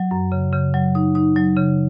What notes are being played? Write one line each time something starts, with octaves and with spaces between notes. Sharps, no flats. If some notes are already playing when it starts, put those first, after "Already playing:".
Already playing: F#3
F#2
C#3
C#3
F#3
D#4
D#4
F#3
C#3